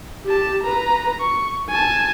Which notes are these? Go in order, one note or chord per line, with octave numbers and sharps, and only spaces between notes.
G4 A5
B4 A#5
C#6
G#5 A5